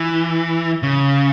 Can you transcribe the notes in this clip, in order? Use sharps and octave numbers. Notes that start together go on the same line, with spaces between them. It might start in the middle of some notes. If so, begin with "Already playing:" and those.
Already playing: E3
C#3